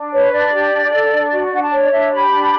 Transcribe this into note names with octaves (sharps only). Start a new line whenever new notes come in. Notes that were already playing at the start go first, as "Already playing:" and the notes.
Already playing: D4
B4 C#5
D4 D5
G4
D4
A4
D4
F#4
D4 F#5
A5
C#5
D5
D4 E5
G4 B5
D4